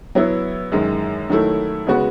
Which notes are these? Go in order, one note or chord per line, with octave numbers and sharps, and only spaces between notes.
F#3 B3 E4
F#2 D#3 G#3
D#3 F#3 A3 E4
C#3 G#3 B3 F#4